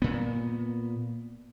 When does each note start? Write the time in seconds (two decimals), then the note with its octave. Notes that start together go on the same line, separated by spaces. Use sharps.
0.02 A#2 B3